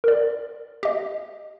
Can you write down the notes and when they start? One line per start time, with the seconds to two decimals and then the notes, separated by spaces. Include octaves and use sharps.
0.04 A#4 D5
0.83 G4 D#5